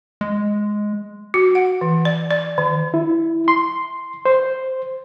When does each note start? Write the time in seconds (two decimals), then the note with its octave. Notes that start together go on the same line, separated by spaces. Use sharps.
0.21 G#3
1.34 F#4
1.55 F#5
1.81 E3
2.05 D5
2.31 D5
2.58 D#3
2.94 E4
3.48 C6
4.25 C5